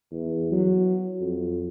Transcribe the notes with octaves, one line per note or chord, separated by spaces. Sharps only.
E2
F#3
F2